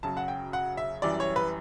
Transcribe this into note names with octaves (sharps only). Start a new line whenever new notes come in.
F#2 C#3 F#3 A5
F#5
G5
F#5
E5
F#2 E3 G3 D5
C#5
B4